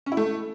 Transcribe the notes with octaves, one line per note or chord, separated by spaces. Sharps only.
C#4
E4
A3